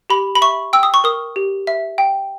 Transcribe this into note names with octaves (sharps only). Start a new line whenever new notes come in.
G4 B5
B5
E5 C#6
G5 E6
D#6
C#6
A#4 D#6
G4
E5
G5